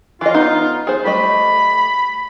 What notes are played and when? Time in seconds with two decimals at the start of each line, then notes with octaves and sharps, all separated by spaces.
0.21 E3 F4 D#5
0.34 B3 D#4
0.87 G#4 C5
1.05 G3 A3 D#5 B5